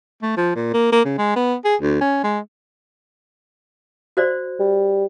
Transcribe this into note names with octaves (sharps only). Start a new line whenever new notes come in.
A3
F3
A#2
A#3
A#3
C#3
G#3
B3
G#4
D2
C#4
G#3
F#4 C5 D5
G3